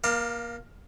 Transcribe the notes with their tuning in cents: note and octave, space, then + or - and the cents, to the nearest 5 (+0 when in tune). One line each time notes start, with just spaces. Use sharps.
A#3 +25 F5 +0 A#5 -45